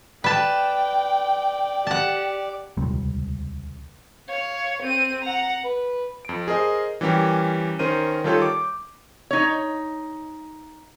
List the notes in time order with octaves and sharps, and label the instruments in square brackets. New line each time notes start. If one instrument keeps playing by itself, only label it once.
[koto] B4 A5 [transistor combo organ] D5 [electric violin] G5
[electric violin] G4 [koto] F#5 A5
[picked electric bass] D#1 C#2 C3 G3
[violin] C#5 F5
C4 D#7
F#5 A#5
[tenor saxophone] B4
[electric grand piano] F2 D7
G#4 A#4 C5 D#5
E3 G3 C#4 G4 A#4
D#3 C#4 A#4 C5 D#7
D#3 G3 F4 A4 C#5 G6
D6
[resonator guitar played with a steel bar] D#4 C#5